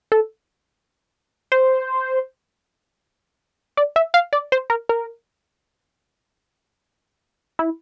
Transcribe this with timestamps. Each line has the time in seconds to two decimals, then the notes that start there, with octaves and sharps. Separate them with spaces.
0.12 A4
1.52 C5
3.77 D5
3.96 E5
4.14 F5
4.33 D5
4.52 C5
4.70 A#4
4.89 A#4
7.59 E4